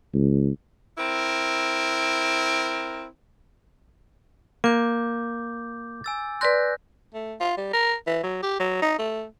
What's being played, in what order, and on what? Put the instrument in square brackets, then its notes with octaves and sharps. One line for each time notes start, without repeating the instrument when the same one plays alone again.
[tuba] C#2
[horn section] C4 E4 A#4
[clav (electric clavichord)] A#3 [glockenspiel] D6 G6
[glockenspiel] G#5 E6 A6
[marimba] B4 D5 C6 [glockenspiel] F#6 G6 A#6
[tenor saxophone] A3
F4
G3
A#4
E3
F#3
G4
F#3
D#4
A3